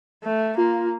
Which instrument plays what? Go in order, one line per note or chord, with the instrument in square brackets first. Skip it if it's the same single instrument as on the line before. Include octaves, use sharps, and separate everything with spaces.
[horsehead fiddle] A3
[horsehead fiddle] A#3 [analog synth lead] F4